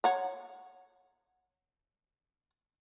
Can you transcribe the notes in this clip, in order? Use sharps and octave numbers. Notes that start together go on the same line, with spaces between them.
C#5 F#5 A#5